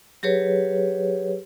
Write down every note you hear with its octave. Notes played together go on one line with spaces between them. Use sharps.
F#3 G4 G#4 B4 C#5